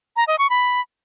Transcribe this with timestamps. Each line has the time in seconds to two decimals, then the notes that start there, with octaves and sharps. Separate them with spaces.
0.16 A#5
0.27 D#5
0.39 C#6
0.50 B5